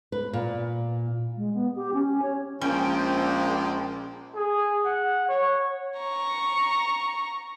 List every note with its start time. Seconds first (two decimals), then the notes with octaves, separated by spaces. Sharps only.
0.12 B4
0.33 A#2
1.37 G#3
1.54 B3
1.76 G4
1.94 C#4
2.22 C#5
2.61 A#1 F3 G#3 A#3 C#4 G5
4.35 G#4
4.85 F#5
5.29 C#5
5.99 A#5 C#6